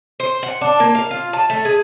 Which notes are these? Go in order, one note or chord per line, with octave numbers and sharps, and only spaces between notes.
C5
F#5
D4
A#3
F5
F4
A5
A3
G#4